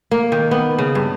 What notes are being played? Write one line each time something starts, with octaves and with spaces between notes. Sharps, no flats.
A#3
D#3
B3
C#3
G2